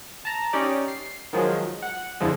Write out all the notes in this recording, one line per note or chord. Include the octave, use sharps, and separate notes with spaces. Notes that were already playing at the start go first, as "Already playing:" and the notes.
A5 A#5
C#4 D#4 G4 D5
C7
D#3 F3 F#3 G#3
F#5
F2 D3 E3 F3 G#3